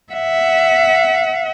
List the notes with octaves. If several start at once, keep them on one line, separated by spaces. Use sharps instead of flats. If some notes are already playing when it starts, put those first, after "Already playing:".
E5 F#5